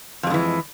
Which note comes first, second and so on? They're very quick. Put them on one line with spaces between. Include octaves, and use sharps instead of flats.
F2 G#3 D3 E3